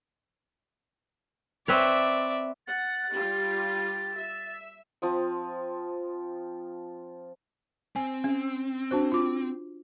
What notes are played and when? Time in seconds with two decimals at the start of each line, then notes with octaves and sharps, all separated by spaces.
1.68 C4 B4 C#5 D5 E5
2.68 F#5 A6
3.13 G3 F4 G4
4.17 E5
5.02 F3 C4 D#6
7.96 C4 G#5
8.24 C#4
8.91 D4 F#4 C5
9.12 F4 D6